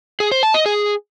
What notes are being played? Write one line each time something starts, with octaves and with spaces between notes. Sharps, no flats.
G#4
C5
A5
D#5
G#4